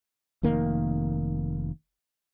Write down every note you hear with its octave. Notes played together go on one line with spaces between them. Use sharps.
F1 D#3 A#3